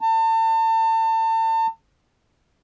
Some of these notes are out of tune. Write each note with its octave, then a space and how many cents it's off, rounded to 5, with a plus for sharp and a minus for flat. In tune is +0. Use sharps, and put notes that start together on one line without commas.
A5 +35